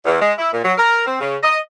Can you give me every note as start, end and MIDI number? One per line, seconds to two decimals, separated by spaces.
0.05 0.20 40
0.21 0.32 56
0.38 0.50 64
0.52 0.63 46
0.64 0.72 54
0.78 1.04 70
1.05 1.20 60
1.20 1.36 49
1.43 1.57 75